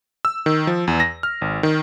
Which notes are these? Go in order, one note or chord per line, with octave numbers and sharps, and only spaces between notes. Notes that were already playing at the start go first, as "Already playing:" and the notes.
E6
D#3
F3
E2
A#6
F6
G#1
D#3